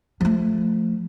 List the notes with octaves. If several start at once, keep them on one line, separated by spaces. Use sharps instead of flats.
F3 A3